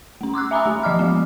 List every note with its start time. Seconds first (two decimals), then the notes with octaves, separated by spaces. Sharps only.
0.21 A3 C#4
0.34 C6 D6 E6 F#6
0.51 E5 G#5 A#5 B5 D#6 E6
0.66 A3 G4
0.83 F3 D#5 D6 F6
0.99 F3 G#3 B3